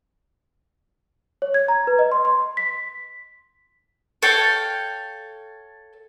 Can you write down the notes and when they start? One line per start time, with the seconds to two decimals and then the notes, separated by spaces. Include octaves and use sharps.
1.42 C#5
1.54 G#6
1.68 A#5
1.87 B4
1.99 D#5
2.12 C6
2.25 C6
2.57 B6
4.22 A4 C#5 F5 G5